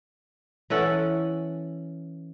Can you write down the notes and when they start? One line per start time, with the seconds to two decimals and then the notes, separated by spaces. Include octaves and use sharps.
0.70 E3 C#4 A4 F#5